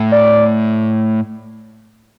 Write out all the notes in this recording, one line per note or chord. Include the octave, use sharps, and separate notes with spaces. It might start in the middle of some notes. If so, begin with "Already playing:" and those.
Already playing: A2
D5